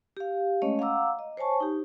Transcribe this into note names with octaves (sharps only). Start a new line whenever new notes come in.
G4 F5
G#3 A3 C#4 C#5 D#5
F5 F#5 A#5 D6 E6
D#5
C5 C#5 G#5 A5 C#6
D#4 G4